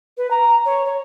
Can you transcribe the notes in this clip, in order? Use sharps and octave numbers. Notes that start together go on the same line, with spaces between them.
B4
A#5
C#5
C#5